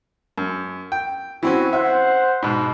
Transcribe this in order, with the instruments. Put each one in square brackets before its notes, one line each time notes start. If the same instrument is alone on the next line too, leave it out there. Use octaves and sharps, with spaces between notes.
[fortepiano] F#2
G5
[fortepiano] E3 C4 C#4 [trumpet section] F#4
[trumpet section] C5 F#5 [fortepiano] E5
[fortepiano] G#2 B2